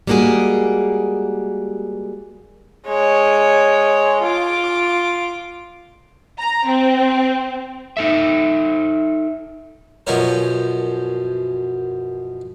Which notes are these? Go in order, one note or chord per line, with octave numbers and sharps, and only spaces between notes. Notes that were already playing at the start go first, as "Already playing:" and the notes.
G3 G#3 A#3 F#4 G#4
G#3 C#5
F4 D6
A#5
C4
D#4 A4 E5
F#2 B2 F3 A#4 C#5